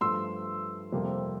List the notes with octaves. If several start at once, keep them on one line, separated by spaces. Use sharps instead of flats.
G2 F3 A3 C6 E6
F2 C3 G3 A#3